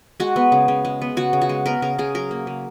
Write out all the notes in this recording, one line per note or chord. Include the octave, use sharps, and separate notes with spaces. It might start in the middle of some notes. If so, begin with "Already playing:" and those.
G#3 F#4
B3
C#3
C#3
G#3
B3
C#3 F#4
C#3
F#4
G#3
B3 A#4
C#3 A#4
C#3 G#4
F#3 A#4
A#3
C#3